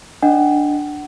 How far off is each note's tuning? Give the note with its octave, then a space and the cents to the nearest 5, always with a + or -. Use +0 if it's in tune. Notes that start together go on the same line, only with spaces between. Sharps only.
D4 +0 D#5 +0 F#5 +25